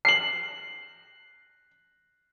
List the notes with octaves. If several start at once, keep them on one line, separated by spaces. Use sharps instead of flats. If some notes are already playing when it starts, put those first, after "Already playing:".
C7 F#7